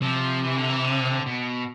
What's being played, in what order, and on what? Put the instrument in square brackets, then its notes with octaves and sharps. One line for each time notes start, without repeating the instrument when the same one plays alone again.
[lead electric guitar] C3 [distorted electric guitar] F3
[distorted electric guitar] E3
D3
E3
D3
B2